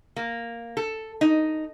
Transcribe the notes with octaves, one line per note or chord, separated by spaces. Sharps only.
A#3
A4
D#4